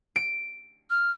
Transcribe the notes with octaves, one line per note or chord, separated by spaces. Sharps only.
D7
F6